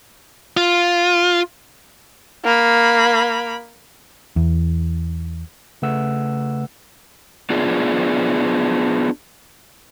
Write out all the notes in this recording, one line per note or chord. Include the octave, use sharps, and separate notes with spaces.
F4
A#3 B5
E2
C#3 A3 B4 F#5 E6
B3 D4 F4 G#4